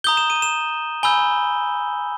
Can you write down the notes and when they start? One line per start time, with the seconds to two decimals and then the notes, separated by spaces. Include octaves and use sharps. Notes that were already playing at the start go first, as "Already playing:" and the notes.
0.04 A#5 D#6 G6 G7
0.17 E7
0.30 D#7
0.42 E7
1.03 G#5 B5 E6 G6 G7